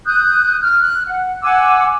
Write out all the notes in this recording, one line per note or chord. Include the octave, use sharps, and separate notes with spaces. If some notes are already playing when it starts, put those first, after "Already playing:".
D#6 F#6 G6
F6
F#6
F#5
F#5 G#5 D6 E6